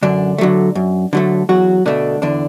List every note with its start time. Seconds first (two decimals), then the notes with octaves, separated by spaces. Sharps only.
0.03 F#2 D3 D4
0.38 D3 F#3 A3
0.75 F#2
1.13 D3 F#3 A3
1.49 E2 F#3 F#4
1.86 B2 D3 A3 D4
2.22 E2 D3 D4